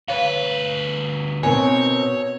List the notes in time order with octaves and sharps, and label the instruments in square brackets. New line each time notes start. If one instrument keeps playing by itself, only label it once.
[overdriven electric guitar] D2 B4 [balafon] C#5 F5
[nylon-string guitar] B2 [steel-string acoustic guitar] C4 D#4 A#4 [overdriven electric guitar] C#5 [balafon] G#5